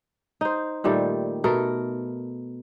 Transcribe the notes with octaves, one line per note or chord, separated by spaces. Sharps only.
D#4 C5
A#2 D#3 G3 A3
B2 A3 A4 A#4